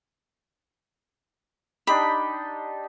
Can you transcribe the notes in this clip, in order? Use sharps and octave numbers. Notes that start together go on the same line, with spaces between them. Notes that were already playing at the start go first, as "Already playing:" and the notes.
D4 D#4 G4 B5